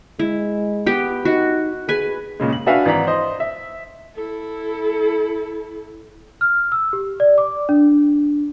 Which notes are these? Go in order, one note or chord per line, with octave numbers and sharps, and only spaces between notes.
G#3 E4
B3 G4 G5
D#4 F#4
G#4 B4 G#5
A#2 C#3 G#3
F#7
D4 F#4 B4 E5 F5 G#5
G#1 E3 D5 A#5 B6 F#7
C5 D#5
E5
E4 A4
F6
E6
G4
D5
D6
D4